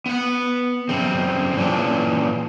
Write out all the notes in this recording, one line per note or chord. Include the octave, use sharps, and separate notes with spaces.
B3 F#5
F#2 C#3 C4
A#2 E3 C#4 D4